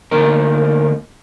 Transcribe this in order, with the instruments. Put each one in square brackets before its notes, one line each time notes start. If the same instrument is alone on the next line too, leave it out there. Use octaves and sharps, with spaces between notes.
[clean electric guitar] D2 D3 A#3 D#4 A#4